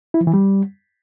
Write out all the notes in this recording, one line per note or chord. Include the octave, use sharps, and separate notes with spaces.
E4
F3
E3
G3